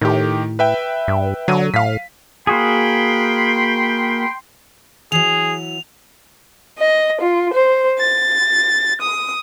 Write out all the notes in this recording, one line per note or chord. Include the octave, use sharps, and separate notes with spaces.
A2 D#3 G4
B4 E5 G5
G2
D3 F#3 D#7
A2 F5 B6
A#3 F#4 G#4 G5 B5 C6
E3 F#3 G#4 F7
D#5
F4
C5
A6
D#6